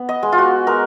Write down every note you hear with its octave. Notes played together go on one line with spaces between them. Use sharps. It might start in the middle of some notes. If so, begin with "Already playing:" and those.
Already playing: B3
D#5
G#3
F4
F#4
G#3 A#4